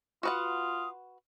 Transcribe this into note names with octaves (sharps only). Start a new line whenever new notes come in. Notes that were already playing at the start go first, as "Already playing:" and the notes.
F4 F#4 B4 F#5 D#6